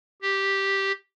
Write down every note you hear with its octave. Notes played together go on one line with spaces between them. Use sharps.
G4